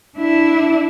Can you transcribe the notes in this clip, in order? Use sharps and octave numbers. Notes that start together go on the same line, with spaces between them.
D4 E4